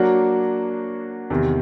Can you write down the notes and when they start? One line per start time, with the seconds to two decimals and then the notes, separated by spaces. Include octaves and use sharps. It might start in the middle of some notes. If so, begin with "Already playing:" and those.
Already playing: F#3 A#3 D4 F#4
1.30 E2 C3 D#3